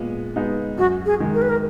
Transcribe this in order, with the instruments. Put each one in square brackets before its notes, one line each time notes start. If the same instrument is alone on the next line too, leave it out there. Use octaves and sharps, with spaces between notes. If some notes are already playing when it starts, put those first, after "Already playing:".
Already playing: [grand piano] A#2 G#3 B3
G#3 B3 D#4
[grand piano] F#2 [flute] F#4
[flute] G#4
[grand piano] D#3 G#3
[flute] A#4
B4
A#4